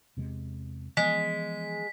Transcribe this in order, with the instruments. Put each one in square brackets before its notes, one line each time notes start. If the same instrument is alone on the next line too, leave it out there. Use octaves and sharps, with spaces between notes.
[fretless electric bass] E2 C3 G#3
[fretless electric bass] E3 F3 B3 [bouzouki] G#3 [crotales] B6